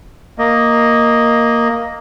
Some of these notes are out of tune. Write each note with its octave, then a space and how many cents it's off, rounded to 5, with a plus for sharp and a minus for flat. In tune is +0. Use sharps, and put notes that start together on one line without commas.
A#3 +0 D#5 +0